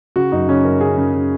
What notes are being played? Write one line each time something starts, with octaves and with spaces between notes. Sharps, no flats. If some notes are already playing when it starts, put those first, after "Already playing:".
C#3 F#4
F#2 D#4
C#3 C#4
F#2 A#4
C#3 G#4
C#3
C#3